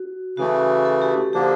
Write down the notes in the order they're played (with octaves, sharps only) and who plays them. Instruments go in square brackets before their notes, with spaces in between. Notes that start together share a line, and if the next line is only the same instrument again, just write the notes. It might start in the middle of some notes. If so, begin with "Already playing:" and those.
Already playing: [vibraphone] F#4
[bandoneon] C#3 E3 A3 [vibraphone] F#4
[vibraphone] A4
G4
[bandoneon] D3 F3 A#3 D4 [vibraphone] G4